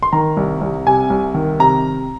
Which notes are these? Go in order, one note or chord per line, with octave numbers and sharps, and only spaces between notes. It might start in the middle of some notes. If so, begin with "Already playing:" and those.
C6
D#3 A#5
C2
C2
C3 G#5
C2
D#3
C3 A#5